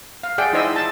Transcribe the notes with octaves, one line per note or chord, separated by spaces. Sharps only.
F5
G#4 D5 E5 F#5 G5
D#4 E4 C5 D#5 E5 E6
A5